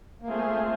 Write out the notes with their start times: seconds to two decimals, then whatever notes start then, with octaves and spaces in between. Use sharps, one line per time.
0.22 A#3
0.28 G#3 A3 C4 F4 G#4 C5